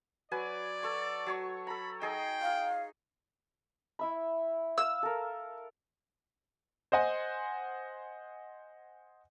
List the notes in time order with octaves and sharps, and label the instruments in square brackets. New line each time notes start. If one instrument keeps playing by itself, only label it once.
[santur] F#3 B4 G#5 [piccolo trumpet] D5
[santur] A4 C#6
F#3 C#5 C#6
[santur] A4 A#5 [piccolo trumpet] B5
[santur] D#4 G#4 D#5 [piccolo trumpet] G5
[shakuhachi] F5
[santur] E4 E5 B5
[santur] F5 [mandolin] E6
[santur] A4 A#4
[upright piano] C5 D#5 F#5 G#5